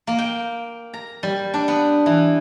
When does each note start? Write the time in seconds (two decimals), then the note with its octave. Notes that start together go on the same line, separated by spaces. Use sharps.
0.07 A#3
0.18 G5
0.94 A#5
1.23 G3
1.54 D4
1.68 B3
2.06 E3